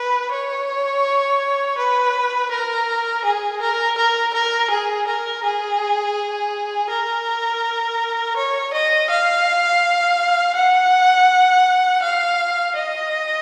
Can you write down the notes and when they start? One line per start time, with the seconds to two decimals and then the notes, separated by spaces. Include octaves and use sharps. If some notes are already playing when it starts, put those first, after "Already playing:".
Already playing: B4
0.32 C#5
1.77 B4
2.51 A#4
3.24 G#4
3.61 A#4
3.97 A#4
4.34 A#4
4.70 G#4
5.07 A#4
5.44 G#4
6.90 A#4
8.36 C#5
8.73 D#5
9.10 F5
10.55 F#5
12.02 F5
12.75 D#5